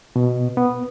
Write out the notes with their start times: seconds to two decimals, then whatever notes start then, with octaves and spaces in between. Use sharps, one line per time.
0.16 B2
0.57 B3